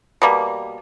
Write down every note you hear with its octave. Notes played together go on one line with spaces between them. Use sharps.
B2 G3 A#3